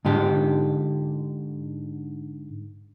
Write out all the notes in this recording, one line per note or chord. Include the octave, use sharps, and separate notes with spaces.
G#2 D3 G4